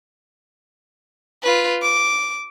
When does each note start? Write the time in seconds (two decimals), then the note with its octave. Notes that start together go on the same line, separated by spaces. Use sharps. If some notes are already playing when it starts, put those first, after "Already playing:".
1.43 F4 B4
1.82 D6